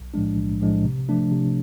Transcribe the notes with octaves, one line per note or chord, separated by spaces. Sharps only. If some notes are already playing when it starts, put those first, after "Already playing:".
Already playing: B1
A2 F3 G#3 D4
B1
A2 F3 G#3 D4
C3
F3 A3 D4
C3